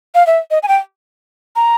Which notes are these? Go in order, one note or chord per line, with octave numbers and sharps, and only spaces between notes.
F5
E5
D#5
G#5
G5
A#5